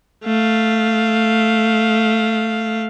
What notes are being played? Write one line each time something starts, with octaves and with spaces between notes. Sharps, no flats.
A3 F5